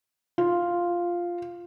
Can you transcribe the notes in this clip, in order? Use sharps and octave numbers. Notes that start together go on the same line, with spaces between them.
F4